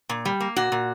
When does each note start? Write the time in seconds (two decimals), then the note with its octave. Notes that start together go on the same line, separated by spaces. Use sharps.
0.09 A#2
0.25 G3
0.40 A#3
0.56 A#2 F#4
0.72 A#2